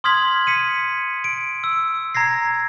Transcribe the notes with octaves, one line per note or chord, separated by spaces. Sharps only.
C6 D#6 F6 G#6 B6 F#7
B6 C#7 D#7
D7
E6
A#5 G#6 A#6 C7